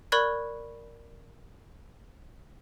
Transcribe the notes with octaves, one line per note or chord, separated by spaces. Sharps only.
A#4 D5 B5 C#6 F#6 G#6